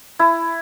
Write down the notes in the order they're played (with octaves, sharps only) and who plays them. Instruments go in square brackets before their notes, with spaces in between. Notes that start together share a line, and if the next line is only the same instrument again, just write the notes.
[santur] E4